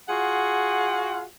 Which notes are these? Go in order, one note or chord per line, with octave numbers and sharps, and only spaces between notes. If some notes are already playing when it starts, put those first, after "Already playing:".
F4 F#4 G#4 F#5